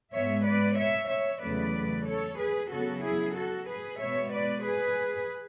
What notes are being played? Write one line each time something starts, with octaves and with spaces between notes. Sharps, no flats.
G#2 G#3 B3 C#5 E5
B4 D5
C#5 E5
C#5 E5
E2 C#3 F#3 A3 B4 D5
A4 C#5
G#4 B4
C#3 F#3 B3 F#4 A4
E4 G#4
F#4 A4
G#4 B4
B2 G#3 B3 C#5 E5
B4 D5
G#4 B4